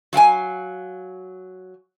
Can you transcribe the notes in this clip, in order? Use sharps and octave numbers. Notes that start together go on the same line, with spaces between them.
F#3 F5 G5 G#5